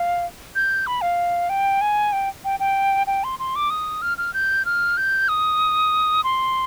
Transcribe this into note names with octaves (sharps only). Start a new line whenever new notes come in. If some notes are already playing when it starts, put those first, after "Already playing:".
Already playing: F5
G6
B5
F5
G5
G#5
G5
G5
G5
G5
C6
C6
D6
D#6
F6
F6
G6
F6
G6
D#6
C6